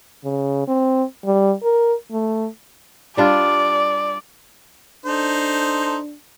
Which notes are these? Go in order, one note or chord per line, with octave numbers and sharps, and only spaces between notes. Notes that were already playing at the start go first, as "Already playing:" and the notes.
C#3
C4
G3
A#4
A3
G3 D4 F4 D5
D4 D#4 A4 C5